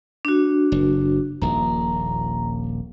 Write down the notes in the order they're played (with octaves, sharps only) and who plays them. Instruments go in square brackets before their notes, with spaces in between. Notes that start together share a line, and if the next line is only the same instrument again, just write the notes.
[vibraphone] D4 F#4
[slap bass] F#1
[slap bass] D#1 A#1 [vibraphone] A#5